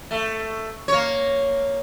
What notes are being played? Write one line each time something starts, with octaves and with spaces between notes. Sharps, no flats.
A3
A#3 C#5